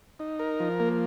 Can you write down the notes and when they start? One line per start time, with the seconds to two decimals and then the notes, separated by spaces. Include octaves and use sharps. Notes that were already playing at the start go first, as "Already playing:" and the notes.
0.19 D#4
0.39 A#4
0.60 F3
0.80 A#3